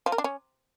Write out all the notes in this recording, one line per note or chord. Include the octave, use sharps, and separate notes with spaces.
F3
A#4
D4
C#4